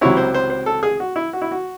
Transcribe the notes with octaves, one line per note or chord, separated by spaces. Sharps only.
C#2 C3 F#3 C4 E4 C#5
C5
C5
C5
A4
G#4
F#4
E4
F#4
E4
F#4